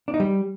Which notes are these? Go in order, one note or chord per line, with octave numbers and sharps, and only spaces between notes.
D4
D#4
G3